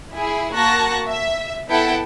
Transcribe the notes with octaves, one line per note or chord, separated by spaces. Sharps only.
E4 G#4
A#3 F#4 A5 C#6 F#6 A#6
E5
B3 E4 A4 F#5 G5 A5